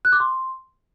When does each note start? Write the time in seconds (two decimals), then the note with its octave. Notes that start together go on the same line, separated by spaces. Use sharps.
0.05 F#6
0.12 D6
0.20 C6